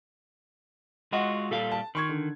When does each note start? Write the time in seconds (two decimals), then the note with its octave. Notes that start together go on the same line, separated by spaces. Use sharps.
1.12 G#3 F4 F#4 D#5 F#5 C6
1.51 A#2 G3 A4 F5
1.72 A5
1.95 D#3 C6 C#6 G#6
2.09 D3